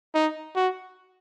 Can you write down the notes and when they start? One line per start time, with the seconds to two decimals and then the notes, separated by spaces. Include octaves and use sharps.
0.14 D#4
0.56 F#4